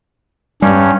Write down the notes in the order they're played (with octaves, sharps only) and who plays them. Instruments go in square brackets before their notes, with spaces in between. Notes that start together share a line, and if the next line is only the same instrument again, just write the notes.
[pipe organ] G2 C#4 [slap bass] G3